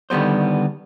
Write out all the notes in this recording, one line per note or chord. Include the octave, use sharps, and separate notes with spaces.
D3 D#3 G3 B3 C5